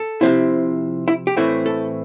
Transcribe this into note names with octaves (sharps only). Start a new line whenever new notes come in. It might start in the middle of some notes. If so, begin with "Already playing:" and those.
Already playing: A4
C3 F3 C4 E4
E4
G4
A2 E3 A3 C4 E4
A4